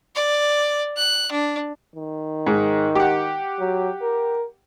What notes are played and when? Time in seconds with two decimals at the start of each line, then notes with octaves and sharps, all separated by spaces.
0.15 D5
0.97 F#6
1.31 D4
1.96 D#3
2.46 G#2 G#3
2.95 G4 F#5
3.59 F#3
4.02 A#4